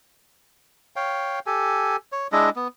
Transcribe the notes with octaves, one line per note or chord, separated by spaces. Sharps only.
C#5 F5 G5
G4 A4 G#5
C#5
G#3 D4 E4 D#5
B3